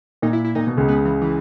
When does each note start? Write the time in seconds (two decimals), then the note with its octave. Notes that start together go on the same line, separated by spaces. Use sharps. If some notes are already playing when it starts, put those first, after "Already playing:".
0.22 A#2 D#4
0.33 E4
0.44 E4
0.55 A#2 D#4
0.67 B2
0.77 C#2 C#3
0.88 B3
1.05 E3
1.21 E3